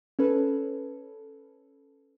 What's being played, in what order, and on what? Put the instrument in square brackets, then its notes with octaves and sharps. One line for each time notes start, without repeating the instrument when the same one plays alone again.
[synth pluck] C#4 A4 B4